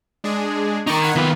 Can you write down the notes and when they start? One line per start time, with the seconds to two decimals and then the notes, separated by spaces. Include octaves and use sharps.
0.24 G#3 D4 G#4
0.87 D#4 A#4 C#6 D6 A6
1.02 F#5 B5 G#6
1.16 D#3 A#3 B3 F4 B4